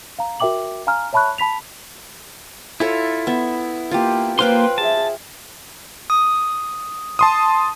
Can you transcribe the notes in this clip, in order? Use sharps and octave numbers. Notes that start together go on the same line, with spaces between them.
F5 A#5
F#4 A#4 E5 G5 D6 F#7
F5 G#5 A#5 C6 F6
C#5 E5 A5 B5 C#6 F#6
A5 B5 B6 F7
E4 F4 A4 C#5
B3 E5
A#3 F4 G4
A#3 F4 B4 C5 F5 G5 C6
G#4 E5 A5
D#6
A5 C6 D#6